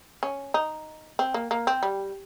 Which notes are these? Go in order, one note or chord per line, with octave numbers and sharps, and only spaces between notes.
C#4
D#4
C4
A#3
A#3
C4
G3